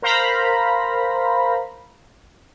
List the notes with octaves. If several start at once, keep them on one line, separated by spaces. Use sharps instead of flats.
A#4 C5 F5 A#5 B5